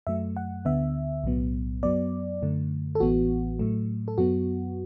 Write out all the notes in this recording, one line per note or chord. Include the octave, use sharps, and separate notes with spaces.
F#2 F#3 A3 E5
F#5
D2 D3 B3 E5
B1 A2 F#3 B3
F#2 F#3 B3 D5
F#2 D3 A3
A4
A1 A2 E3 B3 F#4
A2 F#3 A3
A4
F#2 F#3 B3 F#4